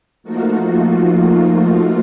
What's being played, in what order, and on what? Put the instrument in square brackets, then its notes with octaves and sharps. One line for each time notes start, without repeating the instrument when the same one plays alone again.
[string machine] F3 A3 A#3 D#4 F4 F#4